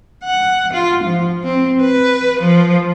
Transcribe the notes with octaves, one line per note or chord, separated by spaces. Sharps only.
F#5
F4
F3
C4
B4
F3